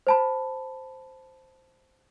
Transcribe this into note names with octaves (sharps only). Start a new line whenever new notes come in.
C5 A5 B5